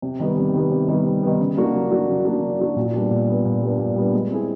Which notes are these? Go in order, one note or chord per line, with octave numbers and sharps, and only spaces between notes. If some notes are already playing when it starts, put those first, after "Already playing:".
C3
D#3 G3 B3
C3
D#3 G3 B3
C3
D#3 G3 B3
C3
D#3 G3 B3
C#3
F#3 A#3 D4 F#4
C#3
F#3 A#3 D4 F#4
C#3
F#3 A#3 D4 F#4
C#3
F#3 A#3 D4 F#4
A#2
G3 B3 D4
A#2
G3 B3 D4
A#2
G3 B3 D4
A#2
G3 B3 D4
G#3
C4 E4 G#4